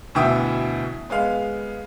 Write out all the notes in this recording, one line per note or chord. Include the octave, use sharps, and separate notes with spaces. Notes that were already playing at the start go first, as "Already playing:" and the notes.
D2 B2 E3 E5 G5 D#6
G#3 B3 F5